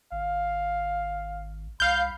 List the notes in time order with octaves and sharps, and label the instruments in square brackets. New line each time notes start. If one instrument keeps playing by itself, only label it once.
[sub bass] G#1 [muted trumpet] F5
[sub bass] C2 [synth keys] F5 G6 [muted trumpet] B5